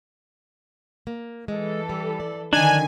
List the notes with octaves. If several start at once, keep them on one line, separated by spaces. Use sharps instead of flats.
A#3
E3 G#3 A4
G3
D5
D3 D#3 F3 D4 D#4 G#5